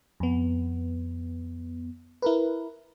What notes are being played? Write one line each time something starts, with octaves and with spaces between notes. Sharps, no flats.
F2 B3
E4 A#4 B4